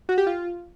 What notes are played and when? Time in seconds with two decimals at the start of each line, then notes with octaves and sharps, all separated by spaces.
0.09 F#4
0.18 G4
0.27 F4